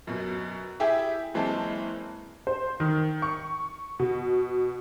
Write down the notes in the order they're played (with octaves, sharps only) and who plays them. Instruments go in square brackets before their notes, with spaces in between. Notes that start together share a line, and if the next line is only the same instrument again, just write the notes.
[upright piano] F#2 B2
E4 G4 G#4 E5 G5
F#1 E3 G#3 C4 A5
[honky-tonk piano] C5
D#3
C#6
B2